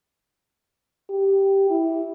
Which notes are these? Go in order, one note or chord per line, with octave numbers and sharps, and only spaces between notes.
G4
E4